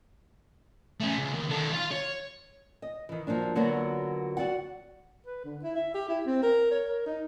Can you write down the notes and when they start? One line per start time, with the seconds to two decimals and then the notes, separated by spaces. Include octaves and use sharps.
1.00 A3 C#4
1.18 C#2
1.34 D#2
1.49 D#3 A4
1.73 F4
1.91 C#5
2.82 D#5
3.09 D#3 E3
3.27 F3 F#3 A#3 D4
3.55 D3 F#3 A#3 B3 F4 F#4
4.37 F#4 D5 F#5
5.26 B4
5.44 D3
5.63 E4
5.76 E5
5.95 G4
6.09 E4
6.26 C4
6.43 A#4
6.71 C#5
6.88 A#4
7.06 D#4